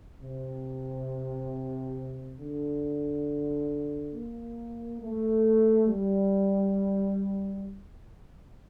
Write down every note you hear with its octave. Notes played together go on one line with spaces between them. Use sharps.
C3
D3
A#3
A3
G3